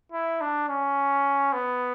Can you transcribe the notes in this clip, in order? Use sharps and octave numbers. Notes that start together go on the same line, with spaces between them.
E4
D4
C#4
B3